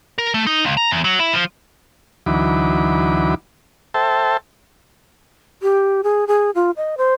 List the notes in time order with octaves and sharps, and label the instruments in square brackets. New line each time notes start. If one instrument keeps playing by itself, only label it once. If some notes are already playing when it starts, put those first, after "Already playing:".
[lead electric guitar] A#4
A3
D#4
C#2
A#5
E2
F#3
E4
F3
[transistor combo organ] D2 E3 F#3 D#4 B5 D6
A4 C5 E5 G5 A5
[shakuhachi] G4
G#4
G#4
F4
D#5
C5